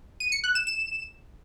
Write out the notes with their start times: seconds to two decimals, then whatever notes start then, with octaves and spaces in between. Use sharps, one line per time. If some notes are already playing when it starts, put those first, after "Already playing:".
0.20 D#7
0.32 C#7
0.44 F#6
0.55 E7
0.67 E7